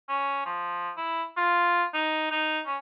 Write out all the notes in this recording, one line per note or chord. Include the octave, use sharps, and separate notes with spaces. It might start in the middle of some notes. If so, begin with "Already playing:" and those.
C#4
F3
E4
F4
D#4
D#4
C#4